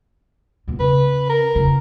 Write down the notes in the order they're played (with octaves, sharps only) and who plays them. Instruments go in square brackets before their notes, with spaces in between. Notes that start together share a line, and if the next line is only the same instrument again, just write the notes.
[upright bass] E2 A#2
[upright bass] C#3 [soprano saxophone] B4
[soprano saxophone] A#4
[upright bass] F2 C#3